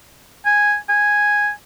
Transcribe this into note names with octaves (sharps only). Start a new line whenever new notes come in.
G#5
G#5